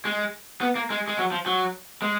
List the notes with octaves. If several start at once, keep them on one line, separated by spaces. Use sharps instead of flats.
G#3
B3
A#3
G#3
G#3
F#3
F3
F#3
G#3